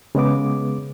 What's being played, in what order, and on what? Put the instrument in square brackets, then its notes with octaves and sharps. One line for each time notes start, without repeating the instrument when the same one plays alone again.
[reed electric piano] C#3 G#3 B3 D6